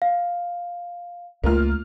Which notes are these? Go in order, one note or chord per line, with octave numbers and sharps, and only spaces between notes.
F5
C#2 A3 A#3 F4 F6